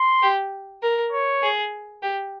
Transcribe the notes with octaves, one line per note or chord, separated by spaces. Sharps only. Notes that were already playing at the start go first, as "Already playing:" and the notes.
Already playing: C6
G4
A#4
C#5
G#4
G4